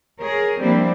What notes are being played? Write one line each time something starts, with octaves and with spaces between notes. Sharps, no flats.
G#4 A#4 C#5
F3 G3 A#3 C4 D4 E4